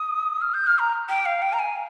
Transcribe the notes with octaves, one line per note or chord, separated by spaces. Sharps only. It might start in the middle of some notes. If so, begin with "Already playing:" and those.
Already playing: D#6
F6
G6
F6
A#5
G5
F5
G5
A#5
G#5